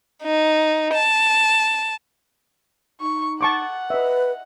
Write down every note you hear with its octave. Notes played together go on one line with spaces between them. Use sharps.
D#4
A5
D#4 C#6
F#5 A5 C#6 D6
B4 D#5 E5